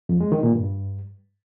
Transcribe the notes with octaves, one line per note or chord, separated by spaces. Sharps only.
F2
G#3
D#3
A#2
G2